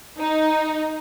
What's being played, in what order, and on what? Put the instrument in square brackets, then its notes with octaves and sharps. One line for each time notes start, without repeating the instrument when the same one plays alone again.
[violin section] D#4